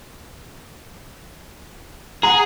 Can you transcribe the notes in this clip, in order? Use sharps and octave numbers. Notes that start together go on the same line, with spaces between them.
G#4 F#5 A#5